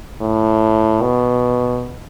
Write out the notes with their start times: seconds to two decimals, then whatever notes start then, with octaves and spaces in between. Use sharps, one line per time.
0.21 A2
1.02 B2